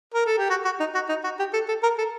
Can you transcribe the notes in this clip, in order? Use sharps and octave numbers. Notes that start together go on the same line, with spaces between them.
A#4
A4
G4
F#4
F#4
D#4
F#4
D#4
F#4
G4
A4
A4
A#4
A4